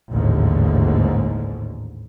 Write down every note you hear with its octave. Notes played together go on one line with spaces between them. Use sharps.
A1 D#2 G#2 D3